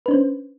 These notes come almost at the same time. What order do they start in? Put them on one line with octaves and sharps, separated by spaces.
B4 D4 C5 C#4